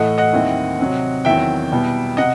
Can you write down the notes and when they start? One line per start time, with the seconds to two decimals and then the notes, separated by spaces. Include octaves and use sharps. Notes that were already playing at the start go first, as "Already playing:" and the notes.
Already playing: A2 E3 A3 D#5 F#5
0.18 D#5 F#5
0.33 D#2 D#3 G3 C4 E4
0.79 C3 F#3 C4
1.25 E2 D#3 F#3 C4 E4 E5 G5
1.72 B2 G3 B3 E4
2.17 C3 D#5 F#5